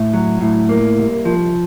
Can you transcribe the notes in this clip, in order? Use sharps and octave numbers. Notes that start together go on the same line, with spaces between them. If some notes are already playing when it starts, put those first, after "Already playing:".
Already playing: A2
F#3
A2
A#3
C2
F3